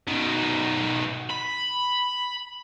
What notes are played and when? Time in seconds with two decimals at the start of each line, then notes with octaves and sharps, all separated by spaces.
0.08 B2 D#3
1.31 B5